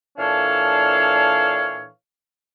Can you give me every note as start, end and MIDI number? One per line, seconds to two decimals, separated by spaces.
0.18 1.88 46
0.18 1.88 52
0.18 1.88 62
0.18 1.88 69
0.18 1.88 73
0.18 1.88 77